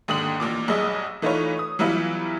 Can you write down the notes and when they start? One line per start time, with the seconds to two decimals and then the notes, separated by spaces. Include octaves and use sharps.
0.08 D#2 G#2 D3 D#6 F#7
0.40 A1 A#2 D6
0.68 B1 G2 G#4 D#5 E6
1.22 E3 A3 D#4 F4 B4 C#5
1.59 D#6
1.79 E3 F#3 G3 B3 E4 F4